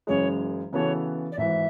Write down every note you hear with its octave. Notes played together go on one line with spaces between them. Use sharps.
F#1 F#2 C#3 E3 G#3 C#5
C#3 E3 B3 F#4 A4 C#5
D5
G#1 G#2 E3 E5